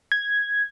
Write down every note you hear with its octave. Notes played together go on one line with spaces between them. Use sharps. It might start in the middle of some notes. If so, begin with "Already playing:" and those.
G#6